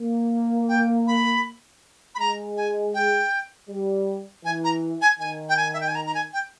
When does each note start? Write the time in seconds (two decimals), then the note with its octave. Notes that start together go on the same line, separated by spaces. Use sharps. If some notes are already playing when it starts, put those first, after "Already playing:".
Already playing: A#3
0.69 G5
1.07 B5
2.15 B5
2.19 G#3 A#5
2.57 G#5
2.94 G5
3.69 G3
4.45 E3 G#5
4.64 A#5
5.02 G#5
5.20 D#3 G#5
5.49 G5
5.57 G#5
5.74 E5
5.81 G5
5.88 G#5
5.95 A#5
6.07 A#5
6.15 G#5
6.33 G5